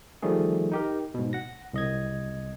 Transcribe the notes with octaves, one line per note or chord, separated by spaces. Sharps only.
D#3 F3 G3 A3 G#4
D#4 G4 A#4
G#2 B2
F#5 A#6
C2 D#5 G#6